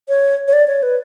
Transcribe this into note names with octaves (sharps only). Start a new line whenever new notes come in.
C#5
C#5
D5
C#5
B4